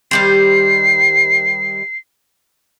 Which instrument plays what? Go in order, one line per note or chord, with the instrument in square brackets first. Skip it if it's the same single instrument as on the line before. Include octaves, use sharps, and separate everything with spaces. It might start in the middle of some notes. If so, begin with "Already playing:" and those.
[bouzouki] D#3 G3 C5 [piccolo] C7